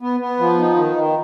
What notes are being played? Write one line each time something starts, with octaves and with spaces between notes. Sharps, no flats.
B3
B3
F3
D#4
D#3
D#3